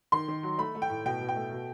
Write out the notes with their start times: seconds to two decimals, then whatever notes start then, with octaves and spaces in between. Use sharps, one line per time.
0.12 D#3 C6
0.28 D#3
0.43 F#3
0.58 A3 B5
0.75 A3
0.82 G5
0.89 A2
1.06 B2 G5
1.21 B2
1.29 G5
1.36 A3
1.53 B2